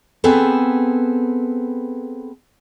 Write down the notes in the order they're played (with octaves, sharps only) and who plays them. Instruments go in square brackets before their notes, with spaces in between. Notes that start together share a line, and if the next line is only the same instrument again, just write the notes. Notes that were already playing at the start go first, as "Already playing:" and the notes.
[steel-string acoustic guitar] B3 C4 G#4 A4 B4